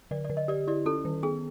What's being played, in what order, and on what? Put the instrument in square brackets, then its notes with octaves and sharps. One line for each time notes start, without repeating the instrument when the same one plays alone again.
[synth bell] D3 [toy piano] D5
[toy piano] D5
[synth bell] D3
[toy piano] D#5
[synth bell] G4 [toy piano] D5
[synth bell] E4 [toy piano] D5
[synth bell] C#4 [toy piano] A4
[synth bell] D#3
[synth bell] B3 [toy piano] G#4